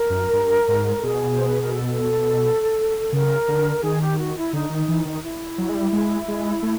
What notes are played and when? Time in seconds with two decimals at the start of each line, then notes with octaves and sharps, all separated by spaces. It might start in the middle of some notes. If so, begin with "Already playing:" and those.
Already playing: A#4
0.10 F#2
0.33 G2
0.68 G#2
0.99 A4
1.03 B2 G#4
1.34 C5
1.47 B4
1.61 A#4
1.73 A4
3.13 C#3 A#4
3.48 D3
3.83 D#3 G#4
4.01 G4
4.18 F#4
4.36 E4
4.53 D3 D#4
4.70 D#3
4.88 E3
5.05 D#3 D#4
5.23 E4
5.58 F#3
5.69 G#3
5.75 G3
5.93 G#3
6.28 G#3
6.63 A3